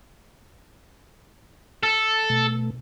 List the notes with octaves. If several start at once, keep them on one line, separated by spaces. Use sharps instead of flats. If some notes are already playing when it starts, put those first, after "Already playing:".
A4
B2 A3